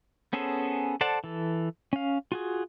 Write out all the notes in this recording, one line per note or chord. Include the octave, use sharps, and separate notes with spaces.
B3 C#4 G#4 A4 C5
A4 C5 D5 F#5 A5
E3 A4
C#4 F5
F4 F#4 G#4